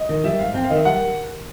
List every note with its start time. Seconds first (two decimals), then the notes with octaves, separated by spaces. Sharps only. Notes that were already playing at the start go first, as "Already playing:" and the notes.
Already playing: D#5
0.09 D#3
0.24 G3 E5
0.39 G#2 F5
0.54 C4 G5
0.64 F5
0.70 D#3 D#5
0.75 E5
0.85 G3 F#5